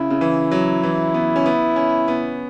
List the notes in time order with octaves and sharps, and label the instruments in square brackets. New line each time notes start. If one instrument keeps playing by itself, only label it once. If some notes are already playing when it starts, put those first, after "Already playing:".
Already playing: [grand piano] C#3 [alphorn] E4
[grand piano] C#3
E3
F#3
E3
B3
C#4
B3
C#4
B3